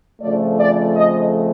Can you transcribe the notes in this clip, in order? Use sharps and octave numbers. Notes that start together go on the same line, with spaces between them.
F2 C#3 F3 A3 D5
D5
D#5